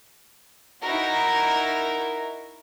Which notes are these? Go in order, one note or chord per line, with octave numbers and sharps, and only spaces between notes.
D#4 E4 F#4 A#4